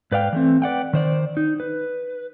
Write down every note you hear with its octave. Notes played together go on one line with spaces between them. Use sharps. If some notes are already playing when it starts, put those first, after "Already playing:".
G#2 B4 D5 F5 G5
E3 A3 C4
B4 D5 F#5 G5
D#3 C5 D5
D#4
B4